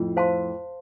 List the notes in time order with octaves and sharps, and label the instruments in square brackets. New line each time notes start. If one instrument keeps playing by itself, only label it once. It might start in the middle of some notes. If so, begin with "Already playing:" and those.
Already playing: [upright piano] F2 A2
[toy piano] C5 F5 A5 C6